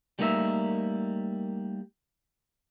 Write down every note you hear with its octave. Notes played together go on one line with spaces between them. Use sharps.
G3 A3 A#3 D#4 A#4 E5